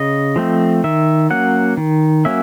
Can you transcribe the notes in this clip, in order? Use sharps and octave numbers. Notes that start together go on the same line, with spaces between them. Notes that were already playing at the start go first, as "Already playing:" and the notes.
Already playing: C#3 D#5
F3 A3 C4
D#3 E5
F#3 A#3 C#4 F#5
D#3
F#3 A#3 C#4 E5